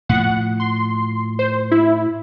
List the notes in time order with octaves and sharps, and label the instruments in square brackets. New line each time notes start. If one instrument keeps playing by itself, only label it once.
[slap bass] A2 F3 [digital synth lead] F#5
[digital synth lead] C6
C5
E4